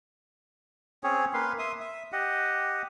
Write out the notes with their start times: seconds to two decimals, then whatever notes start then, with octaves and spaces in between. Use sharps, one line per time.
1.04 C4 C#4 G#4 C#5
1.34 A#3 B4 F5 C6
1.59 E5 C6 D#6
1.81 E5
2.12 G4 D#5 F#5